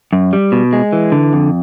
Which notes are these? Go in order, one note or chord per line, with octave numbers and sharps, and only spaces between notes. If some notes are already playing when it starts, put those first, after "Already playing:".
F#2
G3
B2
G#3
E3
D3
F2